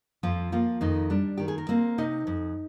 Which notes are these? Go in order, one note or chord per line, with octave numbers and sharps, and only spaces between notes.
F2 F3 F4
F3 A#3 F4
F2 D#3 D#4
G3 D4
D#3 G4
G#4
A#4
A#3 C4 C5
C3 D#4 D#5
F2